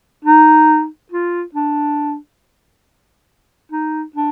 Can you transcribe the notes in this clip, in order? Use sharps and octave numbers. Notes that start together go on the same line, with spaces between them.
D#4
F4
D4
D#4
D4